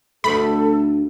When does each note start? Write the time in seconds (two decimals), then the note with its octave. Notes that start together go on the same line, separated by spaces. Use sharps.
0.24 D2 A3 A4 B5